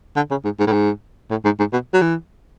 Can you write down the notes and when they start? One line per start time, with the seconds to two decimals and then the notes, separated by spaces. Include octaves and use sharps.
0.16 D3
0.31 C#3
0.44 G#2
0.59 G#2
0.67 A2
0.73 G#2
1.31 A2
1.45 G#2
1.59 G#2
1.73 B2
1.94 F#3
2.02 E3